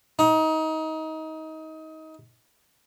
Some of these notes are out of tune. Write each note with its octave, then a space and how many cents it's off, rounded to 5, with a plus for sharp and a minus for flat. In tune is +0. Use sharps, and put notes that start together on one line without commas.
D#4 +25